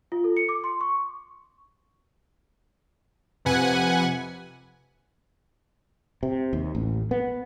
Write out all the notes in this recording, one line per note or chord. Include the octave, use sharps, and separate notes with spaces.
F4
A4
C#7
D6
C6
C#6
F2 C3 B4 F#5 G#5
C3
D#2
A1
B3